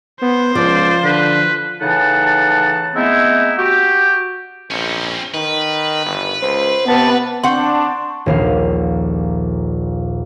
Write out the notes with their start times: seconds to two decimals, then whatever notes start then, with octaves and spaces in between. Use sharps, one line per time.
0.22 B3 C5
0.55 C#2 F3 D5
1.04 D3 B4
1.80 A2 C#3 E3 D#4 F#5 A5
2.95 G#3 A3 B3 C4 D#4 E4
3.58 F#4 G4
4.70 A#1 C4 C#4
5.34 D#3 B4
6.06 G1
6.42 C#2 C5
6.88 C3 B3 A5
7.44 C4 D4 F#5 C6 C#6
8.26 D#1 A#1 F5